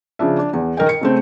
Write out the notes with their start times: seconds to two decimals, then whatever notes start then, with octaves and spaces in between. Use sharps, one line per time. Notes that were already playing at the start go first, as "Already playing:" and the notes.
0.19 C#3 F3 D4 E5
0.39 D4
0.53 E2
0.77 D#3 A#4 D#5 G5
0.89 C#7
1.01 C#3 A3 C4